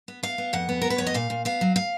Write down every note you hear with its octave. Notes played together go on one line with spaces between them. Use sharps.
B3
B3 F5
B3
F2 F#5
B3
B3 A#4
B4
F2 C#5
D#5
A#2 F5
A#2
B3 F5
F#3
F5